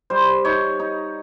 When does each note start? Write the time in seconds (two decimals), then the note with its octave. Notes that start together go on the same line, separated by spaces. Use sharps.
0.10 G3 C5
0.45 D#4 C#5
0.79 D#4